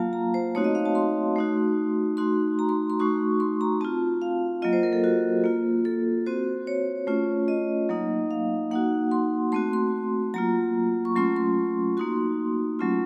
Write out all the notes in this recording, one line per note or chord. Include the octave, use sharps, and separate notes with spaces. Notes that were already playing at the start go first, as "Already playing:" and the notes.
Already playing: F#3 A#3 F4 F5 A5
A#5
C5
A3 C4 D#4 F#4 C#5
D#5
F5
A5
C6
A3 D#4 F#4
A3 D#4 F#4 C6
A#5
C6
C6
A3 D#4 F#4 C#6
C6
A#5
C4 F4 A5
F5
F#3 A#3 F4 D#5
C5
A#4
A4
F#4
A#3 F4
A4
C4 F#4 C5
C#5
A3 C#4 F4
D#5
F#3 A#3 D#4
F5
A#3 D#4 F#4 F#5
C6
A3 C4 F#4 C6
C6
F#3 A#3 F4 A#5
C#6
F#3 A3 C#4 F4 C6
C6
A#3 D#4 F#4 C6
F#3 A3 C#4 F4